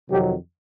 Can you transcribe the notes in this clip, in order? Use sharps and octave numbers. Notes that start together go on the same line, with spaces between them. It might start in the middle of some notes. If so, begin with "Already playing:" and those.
F2 C3 D#3 F#3 G4